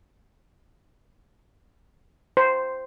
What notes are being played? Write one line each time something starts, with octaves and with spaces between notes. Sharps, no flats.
C5